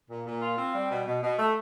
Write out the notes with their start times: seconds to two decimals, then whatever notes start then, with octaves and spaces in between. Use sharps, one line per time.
0.10 A#2
0.26 A#2
0.42 F4
0.57 C4
0.74 G3
0.90 B2
1.06 B2
1.22 B2
1.38 A3